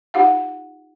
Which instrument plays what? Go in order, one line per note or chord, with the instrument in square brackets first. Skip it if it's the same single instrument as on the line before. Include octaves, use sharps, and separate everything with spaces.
[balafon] D#4 F4 G4 F5 F#5